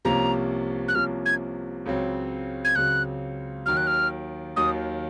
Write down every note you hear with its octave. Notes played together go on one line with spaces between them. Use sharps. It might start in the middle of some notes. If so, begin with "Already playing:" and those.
C2 C3 F3 A#3 C#4 A#5
F#6
C2 C3 F3 A#3 C#4 F6
G#6
C#2 C#3 F#3 C4
G#6
C#2 C#3 F#3 C4 F#6
D#2 D#3 F#3 F6
F#6
F6
D#2 D#3 F#3 D#6